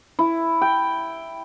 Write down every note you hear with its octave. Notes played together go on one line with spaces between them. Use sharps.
E4
G5